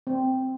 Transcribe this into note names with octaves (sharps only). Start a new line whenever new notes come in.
C4